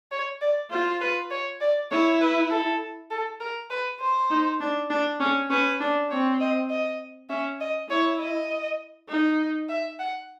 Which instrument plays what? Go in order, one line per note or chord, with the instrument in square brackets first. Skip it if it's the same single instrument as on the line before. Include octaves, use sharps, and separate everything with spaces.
[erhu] C#5
D5
[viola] F4 [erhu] C5
[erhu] B4
C#5
D5
[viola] E4 [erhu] C#5
[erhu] B4
A4
A4
A#4
B4
C5
[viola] D#4
D4
D4
C#4
[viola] C#4 [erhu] B4
[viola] D4
[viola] C4 [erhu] C#5
[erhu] D#5
D#5
[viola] C#4 [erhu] E5
[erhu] D#5
[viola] E4 [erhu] C#5
[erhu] D#5
[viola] D#4
[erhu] E5
F#5